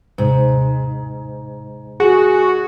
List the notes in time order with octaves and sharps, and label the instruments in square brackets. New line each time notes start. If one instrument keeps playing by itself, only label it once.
[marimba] D#2 C3 [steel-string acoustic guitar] G#2
[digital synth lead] F#4 [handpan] G#4